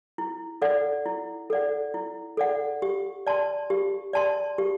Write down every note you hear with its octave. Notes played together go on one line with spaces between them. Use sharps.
E4
A4 D5 F#5
E4
A4 D5 F#5
E4
A4 D5 F#5
G4
D5 A5 C6
G4
D5 A5 C6
G4